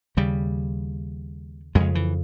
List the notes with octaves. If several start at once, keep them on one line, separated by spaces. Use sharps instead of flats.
D#2 C#3 G3
F2 G#3
C#3
E3